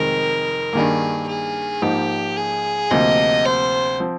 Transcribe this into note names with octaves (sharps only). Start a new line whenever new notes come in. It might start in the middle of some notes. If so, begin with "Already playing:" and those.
Already playing: F1 F2 D#3 G#3 C4 A#4
G2 D#3 A#3 G#4
G#4
G#2 F3 A#3 D#4 G4
G#4
D2 C3 F3 A#3 D#5
C5
F3 C4